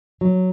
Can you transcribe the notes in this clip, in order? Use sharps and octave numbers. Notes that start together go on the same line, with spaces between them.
F#3